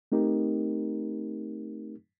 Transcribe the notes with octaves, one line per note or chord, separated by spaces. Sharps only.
A3 C4 D#4 G4 A#4